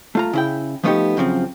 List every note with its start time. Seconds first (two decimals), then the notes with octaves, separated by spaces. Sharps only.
0.15 A3 F4 A#5
0.33 C#3 E4 G5
0.84 F3 A3 B3 D4 D#4 G4
1.17 F#2 C#3 F3 C4